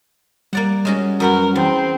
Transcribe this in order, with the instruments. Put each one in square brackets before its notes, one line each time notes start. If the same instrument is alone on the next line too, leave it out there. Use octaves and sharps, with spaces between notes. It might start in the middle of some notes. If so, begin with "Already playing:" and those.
[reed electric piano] G3 [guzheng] A#3 D5 F#5
[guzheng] G#3 C#4 F#4
[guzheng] F#2 B4 F#5 [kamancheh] F#4 A#4
[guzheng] E2 [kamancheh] C4